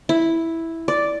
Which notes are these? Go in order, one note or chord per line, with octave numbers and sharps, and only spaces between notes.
E4
D5